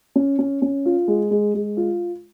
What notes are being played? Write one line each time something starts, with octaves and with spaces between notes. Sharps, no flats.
C#4
C#4
C#4
F4
G#3
G#3
G#3
F4